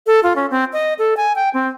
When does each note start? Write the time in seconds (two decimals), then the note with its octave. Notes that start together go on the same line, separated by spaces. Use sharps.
0.07 A4
0.23 F4
0.36 C#4
0.50 C4
0.73 D#5
0.99 A4
1.17 G#5
1.36 G5
1.54 C4